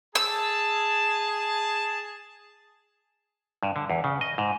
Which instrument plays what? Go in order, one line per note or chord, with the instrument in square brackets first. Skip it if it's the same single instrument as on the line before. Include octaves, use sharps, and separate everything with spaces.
[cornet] G#4 [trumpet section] A5 [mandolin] E6
[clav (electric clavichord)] G2
D3
E2
C#3
D#5
G#2